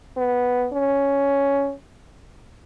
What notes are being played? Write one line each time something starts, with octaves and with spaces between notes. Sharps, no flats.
B3
C#4